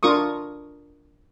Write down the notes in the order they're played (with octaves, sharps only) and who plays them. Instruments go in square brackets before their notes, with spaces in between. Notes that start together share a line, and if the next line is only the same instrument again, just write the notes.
[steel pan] D4 F4 A#4 C#6 D#6